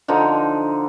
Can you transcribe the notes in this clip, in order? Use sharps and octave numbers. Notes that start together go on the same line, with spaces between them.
D3 F3 D#4